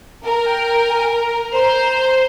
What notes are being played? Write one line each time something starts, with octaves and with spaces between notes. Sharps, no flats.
A#4 A#5
G5
G5
G#5
A#5
C5
A#5
C6